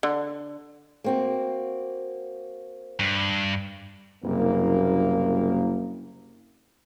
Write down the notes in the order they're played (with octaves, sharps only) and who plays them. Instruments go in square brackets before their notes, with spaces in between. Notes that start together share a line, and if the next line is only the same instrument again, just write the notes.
[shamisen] D3
[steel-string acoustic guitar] A#3 C4 F#4
[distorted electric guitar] G2
[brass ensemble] F#1 C2 F#2 A#3